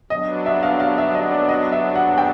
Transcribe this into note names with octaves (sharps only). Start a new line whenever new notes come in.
F#3 B3 D4 D#5
E5
F5
F5
E5
D#5
D5
D#5
E5
F#5
G5